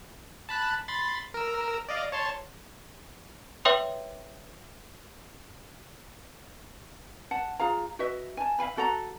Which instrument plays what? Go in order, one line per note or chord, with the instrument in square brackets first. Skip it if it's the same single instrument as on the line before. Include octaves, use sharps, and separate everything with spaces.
[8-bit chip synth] A5 B5 F#6
B5 C6 A6
A#4 E6
D5 D#5 F5
C#5 A5 C6
[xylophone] B4 C#5 E5 G5 C6 D#6
[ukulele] F#5 A5
F4 G#4 F5 A#5
F#4 B4 D#5 E5
G#5 A5
E5 F5 G#5 B5
F#4 A4 F#5 A#5